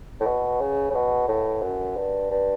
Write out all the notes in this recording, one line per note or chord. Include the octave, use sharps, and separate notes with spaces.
A2
B2
C#3
C#3
B2
A2
F#2
G2
G2